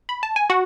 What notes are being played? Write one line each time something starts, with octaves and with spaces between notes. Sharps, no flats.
B5
A5
G#5
F#4 F#5